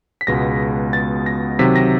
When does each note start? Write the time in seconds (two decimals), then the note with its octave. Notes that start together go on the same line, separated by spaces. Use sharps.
0.21 B6
0.27 C#2 B2 G#3 B3 A#6
0.93 A6
1.26 A#6
1.59 C3 D#3 F#3 B6
1.75 A#6